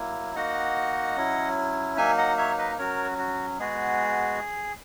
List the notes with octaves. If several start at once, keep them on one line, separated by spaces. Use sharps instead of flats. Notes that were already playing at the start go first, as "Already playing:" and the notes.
Already playing: F#3 A#3 E4
A#3 D#4 F#4 D#5 F#5
F#3 C#4 E4
F#3 A#3 D#4 E5 G#5
D#5 F#5
C#5 E5
B4 D#5
F#3 C#4 F#4 A#4 C#5
F#4
G#3 B3 F#4 G#4